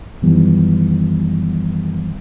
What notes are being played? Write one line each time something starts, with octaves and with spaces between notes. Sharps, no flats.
F#2 B2 D#3 E3 G3 B3